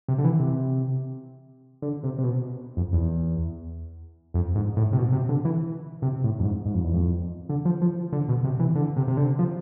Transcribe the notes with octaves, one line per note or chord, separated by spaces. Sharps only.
C3
D3
E3
C3
D3
C3
C3
B2
F2
E2
F2
G#2
A2
C3
B2
C3
D3
E3
C3
A2
F2
G#2
G#2
F2
E2
F2
D3
F3
F3
D3
B2
C3
E3
D3
C3
C3
D3
F3